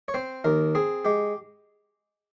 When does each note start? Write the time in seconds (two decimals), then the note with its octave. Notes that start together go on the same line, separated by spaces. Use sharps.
0.08 C#5
0.14 C4 C5
0.44 D#2 A#4
0.75 C4 G#4
1.05 G#3 G4